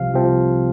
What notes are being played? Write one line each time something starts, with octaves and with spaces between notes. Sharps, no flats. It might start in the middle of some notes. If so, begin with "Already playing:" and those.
Already playing: C2 C3 F3 C4 F5
C2 C3 F3 C4